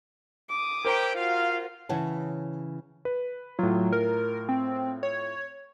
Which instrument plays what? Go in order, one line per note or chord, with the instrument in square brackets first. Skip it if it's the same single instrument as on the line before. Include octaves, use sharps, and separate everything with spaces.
[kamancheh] D6 D#6
[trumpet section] E4 G4 G5 [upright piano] A#4 C5 A#5
[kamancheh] F4 F#4 [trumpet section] F5
[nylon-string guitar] C#3 E3 C#5 E5 F#5 A5
[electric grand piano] B4
[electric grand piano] A2 F4 [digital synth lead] F#3
[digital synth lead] A#4
C4
C#5